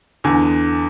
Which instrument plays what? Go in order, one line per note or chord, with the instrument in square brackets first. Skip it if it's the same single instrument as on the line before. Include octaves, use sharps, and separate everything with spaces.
[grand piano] E2 D3 G#5